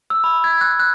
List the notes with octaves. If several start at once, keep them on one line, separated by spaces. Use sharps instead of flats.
E6
B5
G#6
F#6
F#6